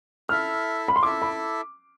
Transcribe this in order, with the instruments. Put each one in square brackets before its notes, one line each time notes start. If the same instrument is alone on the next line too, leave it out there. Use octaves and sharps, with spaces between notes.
[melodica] E4 A4 E5 [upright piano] F6
[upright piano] B5
C6
[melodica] E4 A4 E5 [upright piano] D6
[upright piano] B5